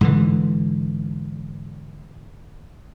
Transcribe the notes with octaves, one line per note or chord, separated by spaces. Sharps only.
G#2 D3 E3